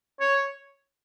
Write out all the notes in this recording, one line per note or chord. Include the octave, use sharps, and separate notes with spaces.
C#5